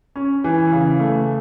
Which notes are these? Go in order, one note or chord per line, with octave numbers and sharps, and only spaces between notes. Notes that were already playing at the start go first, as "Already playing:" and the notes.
C#4
E3
C#3
A3